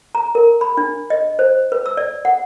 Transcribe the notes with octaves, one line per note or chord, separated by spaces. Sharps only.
A#5
A#4
B5
D4
D#5
C5
B4
E6
D5
F#5